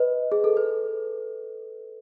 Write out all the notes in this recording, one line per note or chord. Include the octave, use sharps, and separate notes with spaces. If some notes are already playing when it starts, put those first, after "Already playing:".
Already playing: B4 D#5
G#4
A4
B4